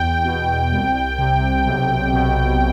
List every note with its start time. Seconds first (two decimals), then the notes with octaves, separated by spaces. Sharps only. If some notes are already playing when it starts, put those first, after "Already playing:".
Already playing: E2 G5
0.25 B2
0.72 C2
1.18 C3
1.66 B1
2.13 B2